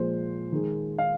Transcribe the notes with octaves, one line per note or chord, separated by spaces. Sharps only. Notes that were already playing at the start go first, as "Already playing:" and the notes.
Already playing: A#2 F3 G#3 C5
D#3 G#3
F5